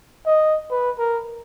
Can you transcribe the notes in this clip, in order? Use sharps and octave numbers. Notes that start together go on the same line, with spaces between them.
D#5
B4
A#4